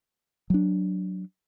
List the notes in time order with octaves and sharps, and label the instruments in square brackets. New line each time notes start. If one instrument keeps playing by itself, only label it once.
[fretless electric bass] F#3 D4